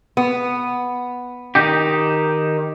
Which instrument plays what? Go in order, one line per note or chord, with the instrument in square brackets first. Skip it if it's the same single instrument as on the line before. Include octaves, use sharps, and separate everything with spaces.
[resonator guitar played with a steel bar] B3
[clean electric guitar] D#3 D#4 G4